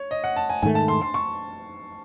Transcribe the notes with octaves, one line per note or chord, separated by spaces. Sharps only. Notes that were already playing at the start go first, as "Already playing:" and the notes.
Already playing: C#5
D#5
F#5
A5
G#5
G#2 D#3 A3 G#5
A5
C6
C6
C#6